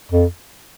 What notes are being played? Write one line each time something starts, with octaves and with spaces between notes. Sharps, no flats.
F2